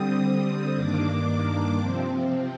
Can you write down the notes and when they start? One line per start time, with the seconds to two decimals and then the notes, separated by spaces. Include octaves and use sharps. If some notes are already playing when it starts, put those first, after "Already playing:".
Already playing: D3 G3 C4 D#6
0.24 D#6
0.75 G2 D#3 A#3 D4 D6
1.27 D6
1.79 C3 F3 C4